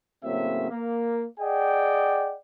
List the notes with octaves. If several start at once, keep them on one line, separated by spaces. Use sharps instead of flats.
A2 C#3 F#3 A#3 C4 E5
A#3
G#4 D5 D#5 F#5 G5